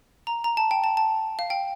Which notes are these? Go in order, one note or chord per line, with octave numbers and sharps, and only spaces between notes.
A#5
A#5
A5
G5
A5
A5
F5
G5